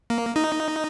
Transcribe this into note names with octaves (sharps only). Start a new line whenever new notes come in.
A#3
D#4